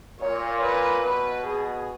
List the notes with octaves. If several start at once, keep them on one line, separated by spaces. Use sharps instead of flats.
A#2 C#5
B4
B2 B4
G#4